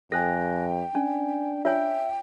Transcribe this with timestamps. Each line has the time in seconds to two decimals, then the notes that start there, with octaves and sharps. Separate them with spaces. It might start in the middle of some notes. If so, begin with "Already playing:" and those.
0.12 F2 A4 G5 G#5 F#6 A#6
0.95 C#4 D4 G#5
1.65 F4 C#5 E5 G5 G#5